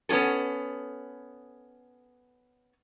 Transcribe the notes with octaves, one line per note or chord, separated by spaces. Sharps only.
B3 C#4 F4 G#4 A4